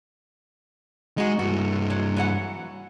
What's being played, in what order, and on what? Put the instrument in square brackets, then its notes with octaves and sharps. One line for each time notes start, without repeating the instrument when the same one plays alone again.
[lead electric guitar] G#3 [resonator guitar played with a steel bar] D#4 F#4
[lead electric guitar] G2 E4 [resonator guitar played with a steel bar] F#4
[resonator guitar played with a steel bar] F#3
E3 F#3 F#5